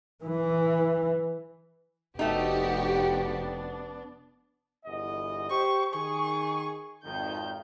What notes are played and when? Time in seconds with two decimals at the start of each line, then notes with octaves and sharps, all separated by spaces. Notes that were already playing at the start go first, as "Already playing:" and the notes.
0.23 E3
2.19 F1 F2 A3 B3 D4 D#4 F#4 G4
4.85 G1 E2 D#5
5.50 G4 C5 C#6
5.94 D#3 G#4 C#6
7.04 G#1 F2 D#3 G6